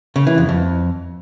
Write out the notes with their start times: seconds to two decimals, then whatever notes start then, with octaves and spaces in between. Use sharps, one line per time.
0.16 C#3
0.27 E3
0.38 F2
0.49 F2